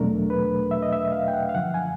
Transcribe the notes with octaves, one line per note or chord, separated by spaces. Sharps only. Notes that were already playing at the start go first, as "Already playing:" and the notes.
Already playing: E2 B2 F#3 A3 D4 A#4
B4
E5
D#5
E5
F5
G5
F#5
F5
F#2 D3 F3 F#5
G#5